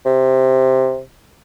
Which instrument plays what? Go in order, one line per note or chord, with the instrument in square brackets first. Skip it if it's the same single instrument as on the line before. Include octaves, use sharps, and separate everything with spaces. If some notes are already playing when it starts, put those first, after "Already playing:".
[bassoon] C3